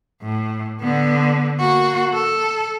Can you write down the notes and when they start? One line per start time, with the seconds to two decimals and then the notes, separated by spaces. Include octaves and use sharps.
0.22 A2
0.80 D3 B3
1.59 A#3 F#4
2.14 A4